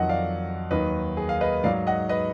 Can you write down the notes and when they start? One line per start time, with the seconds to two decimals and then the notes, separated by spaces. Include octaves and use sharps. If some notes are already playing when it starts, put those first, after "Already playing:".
Already playing: F2 D#3 F#3 D#5 F#5
0.09 D5 F5
0.71 D#2 D#3 F#3 B4 D#5
1.17 G#4
1.29 F5
1.41 B4 D#5
1.63 G#2 F#3 D5 F5
1.87 D#5 F#5
2.09 B4 D#5